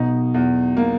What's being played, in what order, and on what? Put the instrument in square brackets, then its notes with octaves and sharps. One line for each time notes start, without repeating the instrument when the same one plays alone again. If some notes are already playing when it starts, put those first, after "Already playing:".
Already playing: [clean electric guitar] B1 B2 [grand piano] D#4
[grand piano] E2
A#3